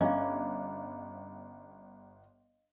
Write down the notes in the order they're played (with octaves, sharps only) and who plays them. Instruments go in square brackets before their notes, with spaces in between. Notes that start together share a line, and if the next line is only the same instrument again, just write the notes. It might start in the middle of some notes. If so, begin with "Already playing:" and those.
[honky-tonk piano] G1 [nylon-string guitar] C#4 [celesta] D#5 F5 [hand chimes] A#5 B5 D6